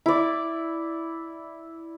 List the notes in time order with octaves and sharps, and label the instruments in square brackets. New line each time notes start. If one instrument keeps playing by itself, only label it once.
[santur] E4 D5